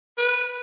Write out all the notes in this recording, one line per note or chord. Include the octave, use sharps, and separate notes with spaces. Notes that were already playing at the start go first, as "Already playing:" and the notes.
B4